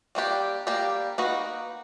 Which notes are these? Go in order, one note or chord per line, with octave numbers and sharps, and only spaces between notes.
G3 A#3 D4 G4
G3 A#3 D4 G4
A#3 D#4 F#4 B4 D#5